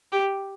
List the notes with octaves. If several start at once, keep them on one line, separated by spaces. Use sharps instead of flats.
G4